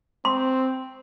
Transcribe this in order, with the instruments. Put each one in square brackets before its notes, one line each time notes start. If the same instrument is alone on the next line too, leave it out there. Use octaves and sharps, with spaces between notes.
[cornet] C4 [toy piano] C6